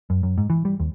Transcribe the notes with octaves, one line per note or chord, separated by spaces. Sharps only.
F#2
F#2
G#2
E3
G3
D#2